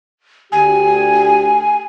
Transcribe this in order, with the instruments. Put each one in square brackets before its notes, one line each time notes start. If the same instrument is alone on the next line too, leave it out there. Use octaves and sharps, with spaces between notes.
[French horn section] D2 D3 G4 [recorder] G#5